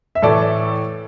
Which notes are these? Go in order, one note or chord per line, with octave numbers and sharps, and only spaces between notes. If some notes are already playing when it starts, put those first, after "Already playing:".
E5
A2 E3 A3 A4 D5